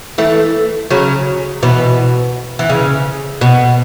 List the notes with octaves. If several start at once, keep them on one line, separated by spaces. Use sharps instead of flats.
E3 A3
C#3 F#3
B2 E3
E3
C#3
B2